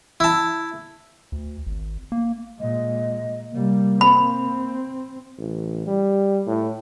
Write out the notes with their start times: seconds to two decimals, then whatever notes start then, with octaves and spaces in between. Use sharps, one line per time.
0.20 E4 A5
1.32 D2
1.67 G#1
2.12 A#3
2.60 A#2 G#3 D#5
3.51 C3 G3 A#3
4.01 C4 B5
5.38 A1
5.87 G3
6.47 A2